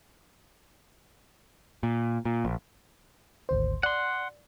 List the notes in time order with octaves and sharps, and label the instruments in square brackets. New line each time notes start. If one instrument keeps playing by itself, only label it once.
[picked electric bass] A#2
A#2
A#1
[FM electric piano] G#1 D2 C5
[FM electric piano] D5 [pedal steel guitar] F#5 C6